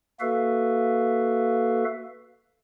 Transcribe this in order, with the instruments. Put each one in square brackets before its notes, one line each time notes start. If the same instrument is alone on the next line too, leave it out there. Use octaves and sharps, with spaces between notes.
[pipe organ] A#3 F#4 A4 B4 E5 F5